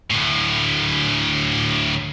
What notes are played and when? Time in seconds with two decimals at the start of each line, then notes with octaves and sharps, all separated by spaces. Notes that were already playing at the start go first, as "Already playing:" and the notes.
0.10 D2 A2